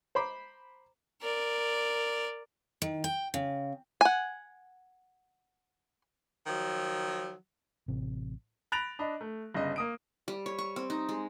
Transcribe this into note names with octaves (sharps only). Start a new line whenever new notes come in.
C5 A#5 B5 D6
A#4 D5
D#3
G5
C#3
F#5 G#5
D#3 F3 F#3
A1 C3
B5 F#6 A6 A#6 D7 F7
D4 D#5 B5
A3
G1 C#3 D#5
A#3 D#6 D7
G3
C#5
C#6
C4
D#4
G#3